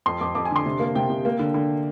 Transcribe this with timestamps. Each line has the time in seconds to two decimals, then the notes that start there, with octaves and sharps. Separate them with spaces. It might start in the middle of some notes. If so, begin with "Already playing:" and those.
0.06 F2 C6
0.21 F2 D6
0.35 F2 D6
0.45 G#5
0.51 D3 C6
0.66 C3
0.80 A#3
0.95 C3 G5
1.10 C3
1.25 A#3
1.39 D3
1.54 D3